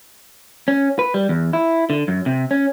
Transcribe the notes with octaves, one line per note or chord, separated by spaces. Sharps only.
C#4
B4
G3
E2
E4
D3
F#2
C3
C#4